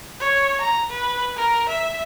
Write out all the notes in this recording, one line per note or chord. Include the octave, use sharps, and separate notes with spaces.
C#5
A#5
B4
A#4
E5